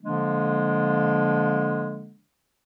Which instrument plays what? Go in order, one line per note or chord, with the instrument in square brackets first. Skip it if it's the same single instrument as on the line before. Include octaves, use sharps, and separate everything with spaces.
[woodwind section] D3 F3 G#3 A#3 D4